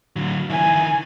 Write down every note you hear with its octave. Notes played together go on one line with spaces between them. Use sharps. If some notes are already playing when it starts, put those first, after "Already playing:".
D3 F#3
D#3 E4 G#5